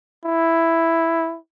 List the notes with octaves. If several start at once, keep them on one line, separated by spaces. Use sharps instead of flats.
E4